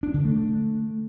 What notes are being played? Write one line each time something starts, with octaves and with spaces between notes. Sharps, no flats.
D4
D3
A3